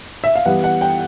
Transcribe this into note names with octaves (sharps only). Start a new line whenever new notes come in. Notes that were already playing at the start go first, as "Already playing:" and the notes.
E5
F5
E3 G3 B3 F#5
F#5
G5